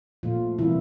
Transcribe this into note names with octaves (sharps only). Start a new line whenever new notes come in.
A#2 F3 A3 F4
C3 E3 G3 A#3 E4